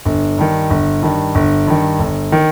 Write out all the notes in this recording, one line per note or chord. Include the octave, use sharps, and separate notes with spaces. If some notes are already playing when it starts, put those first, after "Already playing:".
G1
G2 D#3
G1
G2 D#3
G1
G2 D#3
G1
D#3